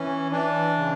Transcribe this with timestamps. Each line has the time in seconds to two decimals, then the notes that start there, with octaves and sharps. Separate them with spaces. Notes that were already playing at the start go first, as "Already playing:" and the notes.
Already playing: E3 C#4
0.31 E3 D4
0.78 C#3